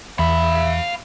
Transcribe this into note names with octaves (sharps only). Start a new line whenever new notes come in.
E2 E5 F5 B5